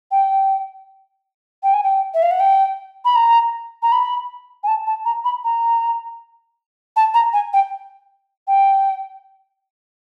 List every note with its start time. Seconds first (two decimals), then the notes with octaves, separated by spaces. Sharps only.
0.11 G5
1.63 G5
1.74 G#5
1.83 G5
2.14 E5
2.22 F5
2.31 F#5
2.40 G5
3.05 B5
3.15 A#5
3.83 A#5
3.92 B5
4.63 G#5
4.67 A5
4.87 A5
5.05 A#5
5.24 B5
5.44 A#5
6.96 A5
7.14 A#5
7.33 G#5
7.53 G5
8.47 G5